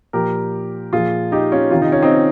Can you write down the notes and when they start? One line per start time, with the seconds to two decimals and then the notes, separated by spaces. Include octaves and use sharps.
0.13 A#2 F3 G4 A#4
0.93 A#2 F3 F4 G#4
1.32 D#4 G4
1.52 C#4 F4
1.71 C3 D#3 F4
1.82 D#4
1.92 C#4
2.02 C4 D#4